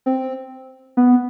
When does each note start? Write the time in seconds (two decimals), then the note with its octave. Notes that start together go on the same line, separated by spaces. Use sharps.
0.06 C4
0.97 B3